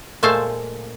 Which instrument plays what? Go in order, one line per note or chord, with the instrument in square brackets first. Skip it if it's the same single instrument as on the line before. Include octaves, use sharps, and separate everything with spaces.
[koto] A#2 G#3 A3 A4 C5 F5